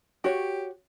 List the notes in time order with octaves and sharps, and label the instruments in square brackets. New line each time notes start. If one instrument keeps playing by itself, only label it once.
[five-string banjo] F#4 C#5 [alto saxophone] G4